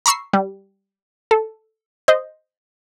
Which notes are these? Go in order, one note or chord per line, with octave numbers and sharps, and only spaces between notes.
A#5 B5 C#6 E6 C7
G3
A4
C5 D#5